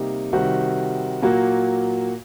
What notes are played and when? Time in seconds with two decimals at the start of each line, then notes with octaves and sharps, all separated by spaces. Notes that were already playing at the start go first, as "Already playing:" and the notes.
Already playing: C3 G3 A#3 D#4 G4
0.33 C3 D#3 G3 C4 F#4
1.22 A#2 F#3 A#3 F#4